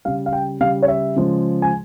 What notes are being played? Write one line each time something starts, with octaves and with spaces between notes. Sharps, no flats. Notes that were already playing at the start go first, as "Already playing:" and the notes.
C#3 G3 F5
F5
G5
C#3 G3 F5
C#5
E5
C#3 F3 G#3
G#5